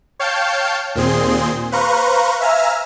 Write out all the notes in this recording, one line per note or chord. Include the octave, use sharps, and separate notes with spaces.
C#5 F5 G5 A5 G6 C#7
D#2 A#2 C4 G#4 C6
B4 C5 F5 A#5 C#6 F#6
E5 F5 G#5 A#5 E6 F6